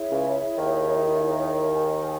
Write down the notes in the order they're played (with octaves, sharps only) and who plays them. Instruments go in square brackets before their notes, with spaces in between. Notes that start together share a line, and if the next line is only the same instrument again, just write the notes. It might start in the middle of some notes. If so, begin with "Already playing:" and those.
Already playing: [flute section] E4 G#4 C#5 E5
[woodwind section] C#2 C#3
D#2 D#3
[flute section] G#4 D#5 G#5